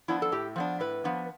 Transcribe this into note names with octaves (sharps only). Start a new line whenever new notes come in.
F3 B3 D4 E4
A4
A2 G4
F3 B3 D4
A2 B4
F3 B3 D4